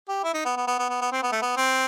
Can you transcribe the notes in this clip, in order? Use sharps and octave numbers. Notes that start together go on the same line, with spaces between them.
G4
E4
D#4
B3
B3
B3
B3
B3
B3
C4
B3
A3
B3
C4